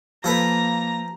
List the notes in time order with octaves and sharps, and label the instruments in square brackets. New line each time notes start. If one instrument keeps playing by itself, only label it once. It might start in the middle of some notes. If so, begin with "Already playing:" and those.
[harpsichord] F3 A4 B4 [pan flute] A#3 [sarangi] A#5